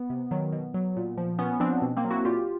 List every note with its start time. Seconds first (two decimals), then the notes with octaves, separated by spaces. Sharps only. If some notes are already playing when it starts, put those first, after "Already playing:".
Already playing: B3
0.10 C3
0.31 D#3 F#3
0.53 B2
0.74 F#3
0.97 A#2
1.18 F3
1.39 A#2 B3 C#4
1.60 F3 C4 D4
1.82 B2
1.97 A#3 C4
2.05 F#3
2.11 E4 F#4
2.25 A#2 F4 G4